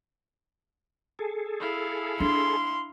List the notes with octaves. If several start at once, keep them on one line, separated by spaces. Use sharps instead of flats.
G#4 A4
E4 F5
D4 C6